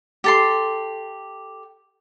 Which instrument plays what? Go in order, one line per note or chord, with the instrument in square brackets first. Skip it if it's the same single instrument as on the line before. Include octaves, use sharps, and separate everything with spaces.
[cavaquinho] G4 A4 C6